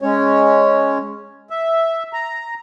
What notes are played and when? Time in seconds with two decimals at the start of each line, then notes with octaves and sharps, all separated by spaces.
0.02 G#3 C#4 C#5
1.50 E5
2.13 A#5